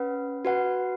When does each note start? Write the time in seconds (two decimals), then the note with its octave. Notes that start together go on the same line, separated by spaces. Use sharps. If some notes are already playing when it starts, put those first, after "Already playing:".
Already playing: C#4 B4 F#5
0.45 F#4 B4 F#5